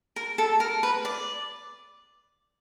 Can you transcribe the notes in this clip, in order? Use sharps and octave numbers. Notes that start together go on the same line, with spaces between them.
A#4
A4
A#4
B4
D5